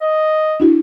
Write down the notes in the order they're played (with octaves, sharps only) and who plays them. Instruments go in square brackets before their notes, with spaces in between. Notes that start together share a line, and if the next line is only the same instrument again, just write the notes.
[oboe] D#5
[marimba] D4 E4 F#4